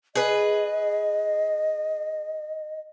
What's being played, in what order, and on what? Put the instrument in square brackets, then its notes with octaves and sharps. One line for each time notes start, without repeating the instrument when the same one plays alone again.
[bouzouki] G#4 B4 [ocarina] D#5